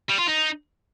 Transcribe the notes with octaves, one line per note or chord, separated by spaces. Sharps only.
G3
F4
D#4